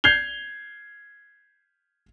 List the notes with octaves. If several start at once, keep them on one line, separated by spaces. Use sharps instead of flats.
G6 G#6 C7 F7 G7